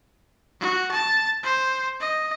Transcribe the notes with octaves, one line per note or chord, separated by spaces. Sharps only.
F#4
A5 A6
C5
D#5